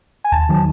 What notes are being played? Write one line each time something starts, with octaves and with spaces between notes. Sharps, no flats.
G#5
D#2 A5
D#3 F#3